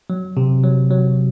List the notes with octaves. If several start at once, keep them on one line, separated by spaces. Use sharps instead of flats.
F#3
C3
F#3
F#3